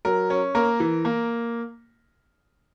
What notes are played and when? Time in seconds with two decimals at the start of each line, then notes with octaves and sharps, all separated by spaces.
0.05 F#3 A#4
0.30 C#4
0.55 A#3 A#4
0.80 E3
1.05 A#3